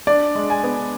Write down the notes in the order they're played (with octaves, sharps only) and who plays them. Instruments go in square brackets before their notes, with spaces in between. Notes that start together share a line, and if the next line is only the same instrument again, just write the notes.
[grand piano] D4 D5
G#3
G#5
B3